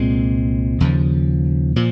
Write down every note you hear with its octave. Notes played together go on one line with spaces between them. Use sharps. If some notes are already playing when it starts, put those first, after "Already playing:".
Already playing: C2 A#2 G#3 C4
D#2 C#3 F3
A#2 F3